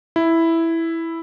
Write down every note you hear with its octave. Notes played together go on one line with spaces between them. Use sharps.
E4